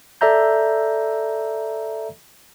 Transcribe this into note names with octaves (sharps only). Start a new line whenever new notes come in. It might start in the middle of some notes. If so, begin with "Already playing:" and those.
A4 D5 E5 A#5 G6